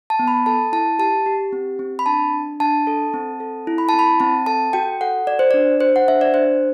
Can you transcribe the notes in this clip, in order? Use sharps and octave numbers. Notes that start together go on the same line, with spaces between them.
A5
B3
B5
A4 A5
E4 A5
G4 A5
G4
C4
C4
B5
D4 A5
D4
D4 A5
A4
C4
A4
E4
B5
A5
C4
B5
C4 A5
A4 A5
F#4 G5
A4 F#5
F#4 D5
C5
D4 D5
F#4 C5
F#5
D4 E5
D5
D4 C5